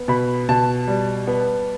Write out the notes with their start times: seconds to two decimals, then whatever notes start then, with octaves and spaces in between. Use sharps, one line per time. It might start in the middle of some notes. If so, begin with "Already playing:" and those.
Already playing: B3
0.08 B2 B5
0.49 B2 A5
0.88 G3
1.27 B3